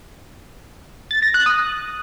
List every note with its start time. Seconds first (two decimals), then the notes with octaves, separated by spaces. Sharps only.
1.11 A6
1.22 A#6
1.34 F#6
1.46 D#6